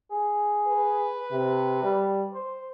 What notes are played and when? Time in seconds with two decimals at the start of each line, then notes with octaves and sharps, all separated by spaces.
0.11 G#4
0.67 B4
1.31 C3
1.83 G3
2.34 C5